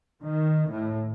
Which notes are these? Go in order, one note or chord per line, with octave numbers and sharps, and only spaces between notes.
D#3
A2